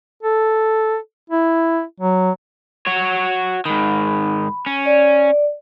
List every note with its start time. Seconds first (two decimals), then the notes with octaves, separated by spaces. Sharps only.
0.23 A4
1.30 E4
2.00 F#3
2.87 F#4 C#5
3.65 G#2 D#3 B5
4.66 C#4
4.86 D5